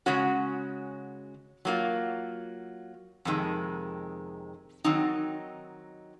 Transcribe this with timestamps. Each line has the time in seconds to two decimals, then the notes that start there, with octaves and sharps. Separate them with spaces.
0.06 C#3 G#3 C#4 F#4 C#5
1.65 F#3 A#3 F4
3.25 F2 C3 D#3 G#3
4.84 D#3 F#3 C4 D#4